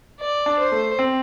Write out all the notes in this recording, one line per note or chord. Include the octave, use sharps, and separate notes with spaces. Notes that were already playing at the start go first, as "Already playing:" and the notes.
D5
D4
C5
A3
C4